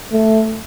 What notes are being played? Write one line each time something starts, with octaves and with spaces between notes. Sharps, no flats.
A3